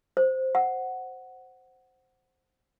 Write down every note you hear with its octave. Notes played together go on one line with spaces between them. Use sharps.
C5
F#5